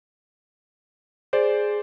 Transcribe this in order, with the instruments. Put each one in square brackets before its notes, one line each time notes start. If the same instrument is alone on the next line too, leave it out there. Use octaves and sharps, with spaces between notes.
[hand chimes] G#4 [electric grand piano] C5 D5